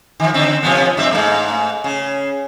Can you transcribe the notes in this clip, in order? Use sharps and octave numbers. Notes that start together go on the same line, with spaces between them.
D#3 F3
D3 C4
C3 F3 B3
G2 C4 E5
G#2 A3
C#3